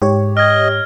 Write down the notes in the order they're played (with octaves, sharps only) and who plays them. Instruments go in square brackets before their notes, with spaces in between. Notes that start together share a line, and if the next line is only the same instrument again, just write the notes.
[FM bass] G#2 [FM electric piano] G4 C#5
[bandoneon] D#5 [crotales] F6 G#6